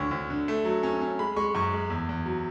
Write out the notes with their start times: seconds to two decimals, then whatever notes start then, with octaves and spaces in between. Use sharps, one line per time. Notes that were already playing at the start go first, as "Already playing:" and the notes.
Already playing: D2 D3 C#5
0.11 D2
0.30 D3
0.48 A3
0.65 F#3
0.83 C#4
1.01 C#4
1.19 G#3 B5
1.36 G#3 C#6
1.55 F#2 C#6
1.73 G#3
1.90 E2
2.09 E2
2.26 F#3